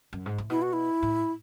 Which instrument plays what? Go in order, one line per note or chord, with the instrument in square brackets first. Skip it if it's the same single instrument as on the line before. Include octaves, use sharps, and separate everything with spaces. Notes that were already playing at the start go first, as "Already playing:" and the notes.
[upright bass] F#2
G#2
A2
[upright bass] B2 [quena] E4
[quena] F#4
E4
[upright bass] A2